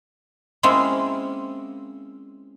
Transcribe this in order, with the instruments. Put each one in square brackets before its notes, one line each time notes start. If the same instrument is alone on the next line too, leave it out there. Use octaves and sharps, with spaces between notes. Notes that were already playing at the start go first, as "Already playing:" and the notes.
[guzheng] G#3 A#3 C4 C#4 E4 F4